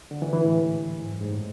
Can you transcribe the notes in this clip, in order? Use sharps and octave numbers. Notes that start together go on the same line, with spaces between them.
D3
E3
E3
A2
G#2
F#2
G#2
A2